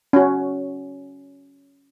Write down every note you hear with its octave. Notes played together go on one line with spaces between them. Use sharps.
C#4 F#4